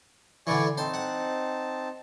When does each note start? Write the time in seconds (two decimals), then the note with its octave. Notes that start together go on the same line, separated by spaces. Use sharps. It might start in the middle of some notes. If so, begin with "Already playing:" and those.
0.47 D3 E3 D5 G#5 C#6
0.78 C4 D#4 C5 A5
0.94 F#5